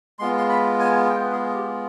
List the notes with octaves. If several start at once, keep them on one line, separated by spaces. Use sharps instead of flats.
G#3 B3 F4 C6
C6
B5
G#5
G5
B4
G#4
G4